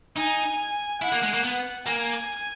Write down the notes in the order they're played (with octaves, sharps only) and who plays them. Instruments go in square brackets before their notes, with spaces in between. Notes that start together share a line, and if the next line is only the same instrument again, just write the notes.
[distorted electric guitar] D#4 [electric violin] G#5
[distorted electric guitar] E4 [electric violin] F#5
[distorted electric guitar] A#3
G#3
A#3
B3
[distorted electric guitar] A#3 [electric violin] G#5